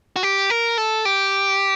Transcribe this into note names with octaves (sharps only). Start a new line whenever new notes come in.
F#4
G4
A#4
A4
G4